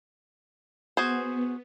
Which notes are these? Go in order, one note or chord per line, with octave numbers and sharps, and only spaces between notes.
B3 F#4 G#4 C5